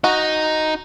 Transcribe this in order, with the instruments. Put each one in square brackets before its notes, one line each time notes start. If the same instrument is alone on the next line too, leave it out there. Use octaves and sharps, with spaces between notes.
[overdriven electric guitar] D#4 [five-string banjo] F#4